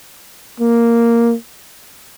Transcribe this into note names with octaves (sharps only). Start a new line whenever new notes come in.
A#3